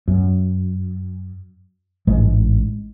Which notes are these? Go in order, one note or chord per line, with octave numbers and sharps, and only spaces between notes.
F#2
A1 G#2 G#3